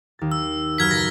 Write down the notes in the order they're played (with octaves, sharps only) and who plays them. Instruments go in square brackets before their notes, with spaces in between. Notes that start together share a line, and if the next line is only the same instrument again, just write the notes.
[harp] D#2 A6
[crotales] E6
[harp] F#2 F#3 B4 [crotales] F6 G#6 B6
[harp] C#2 A#4 [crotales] A#6